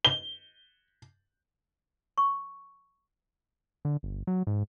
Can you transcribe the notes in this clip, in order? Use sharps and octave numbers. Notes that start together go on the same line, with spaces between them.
G7
C#6
D3
G1
F#3
G#2